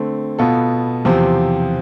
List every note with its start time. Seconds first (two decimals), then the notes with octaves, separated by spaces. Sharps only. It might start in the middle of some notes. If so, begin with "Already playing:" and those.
Already playing: D3 A3 C4
0.39 B2 B3 F4 A4
1.05 E2 C3 F3 C4 G4